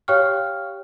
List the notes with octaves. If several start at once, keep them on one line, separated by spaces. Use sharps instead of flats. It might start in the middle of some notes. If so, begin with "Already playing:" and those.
G4 C#5 F5 G5 C#6 F6